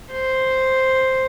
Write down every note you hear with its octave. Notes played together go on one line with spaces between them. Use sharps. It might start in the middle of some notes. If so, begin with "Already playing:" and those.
C5